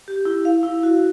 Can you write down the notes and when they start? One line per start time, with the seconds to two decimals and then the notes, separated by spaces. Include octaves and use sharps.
0.08 G4
0.25 E4
0.45 F5
0.63 E4
0.83 F#4